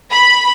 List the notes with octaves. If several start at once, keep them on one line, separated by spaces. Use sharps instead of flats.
B5